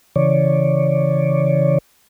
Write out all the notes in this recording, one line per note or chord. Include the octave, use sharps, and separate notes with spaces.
C#3 E3 C#5 D5